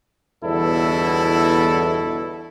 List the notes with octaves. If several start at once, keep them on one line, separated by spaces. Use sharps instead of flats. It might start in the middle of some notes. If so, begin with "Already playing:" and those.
G1 E2 B2 E4 A4